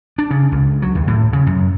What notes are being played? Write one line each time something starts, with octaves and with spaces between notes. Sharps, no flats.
D4
C#3
C#2
F#3
D#2
A2
C#3
F#2